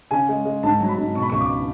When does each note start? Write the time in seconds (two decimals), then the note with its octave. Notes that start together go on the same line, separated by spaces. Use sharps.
0.11 C#3 G#5
0.29 G#3
0.45 G#3
0.63 G#2 A5
0.80 F#3
0.88 B5
0.98 G#2
1.15 B2 C#6
1.22 B5
1.30 C#2 C#6
1.41 D6